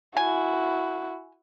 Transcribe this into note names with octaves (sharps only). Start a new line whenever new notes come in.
E4 F#4 G#5